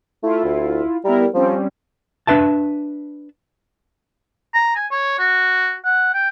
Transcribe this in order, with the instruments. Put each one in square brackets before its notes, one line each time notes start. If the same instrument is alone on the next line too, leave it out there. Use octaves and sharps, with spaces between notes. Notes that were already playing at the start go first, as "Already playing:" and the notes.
[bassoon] A3 [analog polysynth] E4 F4
[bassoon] D2
[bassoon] G3 [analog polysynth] B3 E4 A#4
[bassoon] F3 [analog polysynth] G3 C4 C#4
[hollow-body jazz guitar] D4 B4 E5 A5
[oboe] A#5
G#5
C#5
F#4
F#5
G5